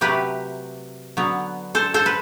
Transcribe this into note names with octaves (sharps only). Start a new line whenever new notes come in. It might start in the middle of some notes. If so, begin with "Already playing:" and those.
C3 F#3 A3 G4 B4
D3 F#3 B3
A4 C5
A4 C5
B4